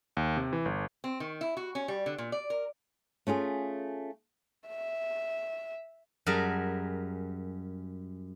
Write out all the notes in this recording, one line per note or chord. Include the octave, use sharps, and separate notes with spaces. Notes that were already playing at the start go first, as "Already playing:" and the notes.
D#2
C3
E3
G1
C4
D#3
E4
F#4
C#4
G3
D3
A#2
D5
A#4
A3 C#4 F4 G#4
E5
F#2 G3 G#4 A#4 A5